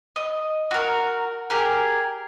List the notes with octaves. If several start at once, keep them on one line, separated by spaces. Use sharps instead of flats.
D#5
F#4 A#4
G4 G#4 A#4